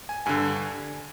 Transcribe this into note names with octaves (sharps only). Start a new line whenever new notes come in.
G#5
G2 D3 G#5